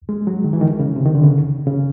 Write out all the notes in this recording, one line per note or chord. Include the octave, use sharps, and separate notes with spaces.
G#3
F#3
D#3
E3
D#3
C#3
C3
D#3
D3
C#3
C#3